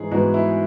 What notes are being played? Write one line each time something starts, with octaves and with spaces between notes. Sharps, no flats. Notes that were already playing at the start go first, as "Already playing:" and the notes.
Already playing: G#2 E3 G#4
G#2 E3 B3 F#4
E4